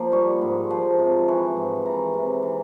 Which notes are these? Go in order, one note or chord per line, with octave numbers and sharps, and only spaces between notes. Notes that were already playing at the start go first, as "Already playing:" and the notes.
Already playing: F3 A#3
G3 C#6
G#2
F3 C6
C3
E3 C#6
G#2
E3 A#5
C3
E3